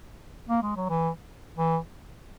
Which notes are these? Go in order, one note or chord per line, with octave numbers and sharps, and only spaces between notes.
A#3
G#3
F#3
E3
E3